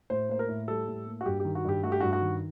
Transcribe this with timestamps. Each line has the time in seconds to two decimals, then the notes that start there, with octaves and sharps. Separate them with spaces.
0.10 A2 C5
0.29 A#3 C5
0.39 A#4
0.49 A2
0.68 G3 A4
0.87 A2
1.06 A#3
1.21 F#4
1.26 G2 G4
1.40 D#3 G4
1.55 F#4
1.65 G2 G4
1.83 A3 F#4
1.92 G4
2.00 G2 F#4
2.13 F#4
2.22 D#3